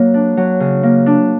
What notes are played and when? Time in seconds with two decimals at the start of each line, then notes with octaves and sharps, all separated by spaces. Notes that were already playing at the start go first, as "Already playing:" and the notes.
Already playing: F#3 A#3
0.14 D4
0.37 F#3
0.60 C#3
0.83 A#3
1.06 D4